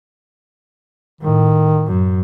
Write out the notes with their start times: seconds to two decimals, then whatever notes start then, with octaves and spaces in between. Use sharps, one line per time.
1.21 A2 D#3
1.87 F#2